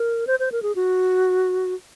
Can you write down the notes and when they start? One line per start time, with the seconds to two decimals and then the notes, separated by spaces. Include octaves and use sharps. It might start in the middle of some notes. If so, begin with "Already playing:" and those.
Already playing: A#4
0.27 C5
0.40 C5
0.52 A#4
0.62 G#4
0.75 F#4